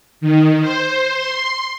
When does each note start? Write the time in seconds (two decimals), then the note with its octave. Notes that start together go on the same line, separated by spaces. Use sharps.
0.21 D#3
0.61 C5
1.15 C6